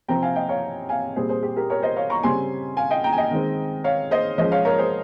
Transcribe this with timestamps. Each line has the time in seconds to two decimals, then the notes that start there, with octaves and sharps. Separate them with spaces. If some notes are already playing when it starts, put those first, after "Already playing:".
0.08 C3 F3 C4 G5 A#5
0.22 F5 G#5
0.36 D#5 G5
0.49 C#5 F5
0.89 F5 G#5
1.16 A#2 G3 C4 G#4 C5
1.29 G#4 C5
1.43 G4
1.56 G4 A#4
1.70 A#4 C#5
1.83 C5 D#5
1.96 C#5 F5
2.10 A#5 C#6
2.23 C#3 G3 C4 G#5 C6
2.77 F5 G#5
2.90 D#5 G5
3.04 G5 A#5
3.12 G#5
3.17 D#5 G5
3.31 D#3 G#3 C4
3.84 C#5 F5
4.11 C5 D#5
4.38 F3 G#3 C#4 C5 D#5
4.52 C#5 F5
4.65 A#4 C#5
4.78 G#4 C5